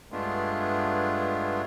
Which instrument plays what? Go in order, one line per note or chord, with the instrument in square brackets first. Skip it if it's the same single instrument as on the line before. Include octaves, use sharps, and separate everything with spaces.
[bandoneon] G2 G#3 A3 B3 D4 F4